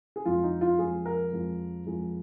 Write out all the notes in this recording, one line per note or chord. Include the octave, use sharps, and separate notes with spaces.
G#4
F2 F3 G#3 F4
D#4
F4
F2 F3 G#3 G#4
A#4
F2 F3 G#3
F2 F3 G#3